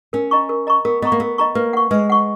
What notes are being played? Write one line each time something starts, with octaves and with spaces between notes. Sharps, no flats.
C#4 A#4
D#5 A#5 C#6
A#4
D#5 A#5 C#6
B3 A#4
B3 D#5 A#5 C#6
A#3
B3 A#4
D#5 A#5 C#6
A#3 B4
F#5 C#6
G#3 B4
F#5 C#6